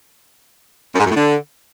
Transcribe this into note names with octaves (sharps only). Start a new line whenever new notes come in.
F#2
G#2
F#2
A2
D3